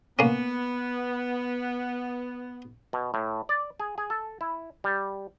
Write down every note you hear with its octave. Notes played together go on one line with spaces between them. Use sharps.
A#3 B3 C#4
B2
A2
D5
G#4
G#4
A4
E4
G3